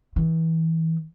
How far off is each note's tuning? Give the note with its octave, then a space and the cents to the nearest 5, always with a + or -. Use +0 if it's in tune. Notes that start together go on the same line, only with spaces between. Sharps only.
E3 -25